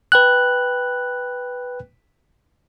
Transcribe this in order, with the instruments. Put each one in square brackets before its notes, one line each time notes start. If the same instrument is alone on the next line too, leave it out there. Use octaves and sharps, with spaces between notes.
[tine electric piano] B4 G5 F#6